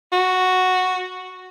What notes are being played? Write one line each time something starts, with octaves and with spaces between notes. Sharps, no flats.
F#4